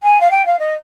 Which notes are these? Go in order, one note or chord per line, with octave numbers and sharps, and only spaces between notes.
G#5
F5
G5
F5
D#5